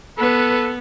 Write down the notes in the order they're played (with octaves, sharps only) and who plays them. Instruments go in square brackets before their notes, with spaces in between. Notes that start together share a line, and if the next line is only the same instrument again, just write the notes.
[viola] B3 [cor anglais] A4 [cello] B4